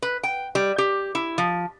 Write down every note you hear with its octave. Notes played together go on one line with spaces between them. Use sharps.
B4
G5
G3
G4
E4
F3